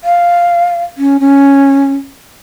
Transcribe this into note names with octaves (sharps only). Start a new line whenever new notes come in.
F5
C#4
C#4